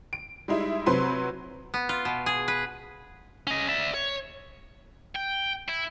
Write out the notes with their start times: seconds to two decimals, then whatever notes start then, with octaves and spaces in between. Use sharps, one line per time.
0.13 D7
0.48 G3 G#3 D#4 E4
0.86 C3 F#3 B4 C5 C6
1.74 B3
1.89 F4
2.05 B2
2.26 G#4
2.48 B4
3.47 C#4 D#5
3.69 D5 E5
3.94 C#5
5.15 G5
5.68 E4